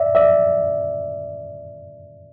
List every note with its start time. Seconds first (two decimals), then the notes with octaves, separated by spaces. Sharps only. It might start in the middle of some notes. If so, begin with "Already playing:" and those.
Already playing: D5 E5
0.15 D5 E5